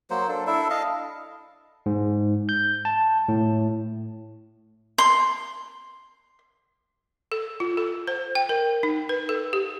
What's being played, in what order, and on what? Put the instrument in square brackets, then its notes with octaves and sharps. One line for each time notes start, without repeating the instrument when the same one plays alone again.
[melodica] F#3 A#3 C5
D4 A4
D4 E4 A4 E5
D#5 F5 A5
[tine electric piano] G#2
G6
A5
A2
[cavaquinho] C6
[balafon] A4
F4
A4
C5
G5
A#4
D#4
B4
A4
G4